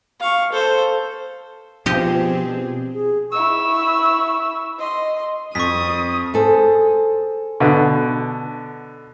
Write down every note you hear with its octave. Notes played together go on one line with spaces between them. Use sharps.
F5 C#6
A4 C5
B2 F3 C4 D4 G4 G#4 D#5
G#4
E4 C#6 E6
D#5 C6
F2 C#6 D#6 B6
G#4 A4 C5
B2 D3